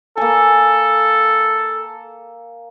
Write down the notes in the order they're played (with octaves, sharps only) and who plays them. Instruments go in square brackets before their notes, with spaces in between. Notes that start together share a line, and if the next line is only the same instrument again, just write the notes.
[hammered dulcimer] A#3 G#5 [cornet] A4